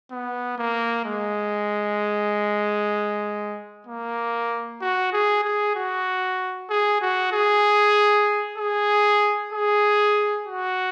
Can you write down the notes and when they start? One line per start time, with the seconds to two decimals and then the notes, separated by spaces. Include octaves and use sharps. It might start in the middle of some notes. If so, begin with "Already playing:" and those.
0.11 B3
0.58 A#3
1.05 G#3
3.87 A#3
4.81 F#4
5.13 G#4
5.44 G#4
5.75 F#4
6.70 G#4
7.01 F#4
7.32 G#4
8.58 G#4
9.53 G#4
10.47 F#4